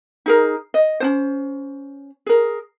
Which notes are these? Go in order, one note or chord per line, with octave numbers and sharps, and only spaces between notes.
D#4 G#4 A#4
D#5
C#4 D4 C5
G#4 A#4